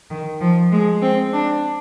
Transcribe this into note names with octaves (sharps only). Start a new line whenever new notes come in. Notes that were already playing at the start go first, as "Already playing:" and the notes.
D#3
F3
G#3
C4
D4